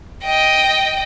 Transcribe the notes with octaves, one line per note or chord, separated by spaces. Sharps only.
D#5 G5